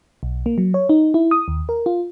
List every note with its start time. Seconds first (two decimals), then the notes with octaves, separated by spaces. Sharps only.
0.23 B1
0.46 A#3
0.58 F#3
0.74 C#5
0.89 D#4
1.14 E4
1.31 D#6
1.48 D#2
1.69 A#4
1.86 F4